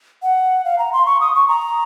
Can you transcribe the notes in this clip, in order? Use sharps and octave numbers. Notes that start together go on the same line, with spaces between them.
F#5
F5
A#5
C6
C#6
D#6
C#6
A#5